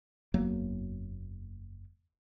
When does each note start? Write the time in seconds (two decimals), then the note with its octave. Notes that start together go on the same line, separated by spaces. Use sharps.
0.34 F#1 E2 F#3 A#3